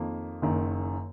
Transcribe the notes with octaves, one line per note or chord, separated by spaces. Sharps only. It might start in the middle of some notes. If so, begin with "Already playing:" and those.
Already playing: F2 D#3 A#3
F#1 F#2 D#3